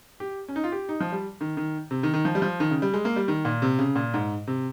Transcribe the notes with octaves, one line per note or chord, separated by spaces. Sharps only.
G4
C#4
D#4
F4
G4
D#4
F3
G3
D#3
D#3
C3
D#3
D#3
F3
G3
F3
D#3
C#3
G3
G#3
A#3
G3
D#3
A#2
C3
C#3
A#2
G#2
C3